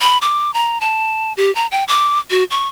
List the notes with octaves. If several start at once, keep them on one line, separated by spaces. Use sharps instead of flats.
B5
D6
A#5
A5
G4
A#5
G5
D6
F#4
C#6